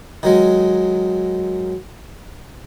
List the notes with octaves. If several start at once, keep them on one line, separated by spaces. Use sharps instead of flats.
D#3 F#3 G#3